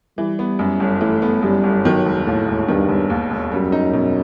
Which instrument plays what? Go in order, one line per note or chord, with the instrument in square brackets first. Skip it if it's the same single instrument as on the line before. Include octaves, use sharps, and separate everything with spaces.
[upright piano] E3 [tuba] G3
[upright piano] B3
F#2
G1
[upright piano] E3 [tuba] A3
[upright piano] B3
[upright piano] F#2 [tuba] G3
[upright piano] G1
[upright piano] D#3 [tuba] F#3
[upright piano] E1
[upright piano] D#2 [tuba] A2
[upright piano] E1
[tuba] G2 [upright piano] D#3
[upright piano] E1
D#2
E1
[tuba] F#2 [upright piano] G3
[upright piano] D#4
B2